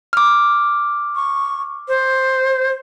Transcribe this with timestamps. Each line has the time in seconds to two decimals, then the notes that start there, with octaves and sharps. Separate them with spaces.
0.13 D6 F6
1.16 C#6
1.88 C5